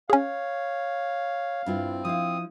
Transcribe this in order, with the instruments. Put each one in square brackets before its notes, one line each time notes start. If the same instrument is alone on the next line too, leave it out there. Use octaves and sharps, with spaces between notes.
[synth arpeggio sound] C#4 G#4 [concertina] C#5 [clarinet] F5
[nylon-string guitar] G2 E4 F4 [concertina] C4
[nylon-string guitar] F3 E4 F5 [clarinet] D#6